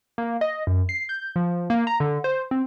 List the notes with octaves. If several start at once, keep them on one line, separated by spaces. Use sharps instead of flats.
A#3
D#5
F#2
C7
G6
F3
A#3
A#5
D3
C5
C4